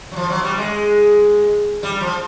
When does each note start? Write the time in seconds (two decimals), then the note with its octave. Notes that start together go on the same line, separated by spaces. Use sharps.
0.12 F#3
0.16 F3
0.30 F#3
0.43 G3
0.58 G#3
1.83 G3
2.01 F3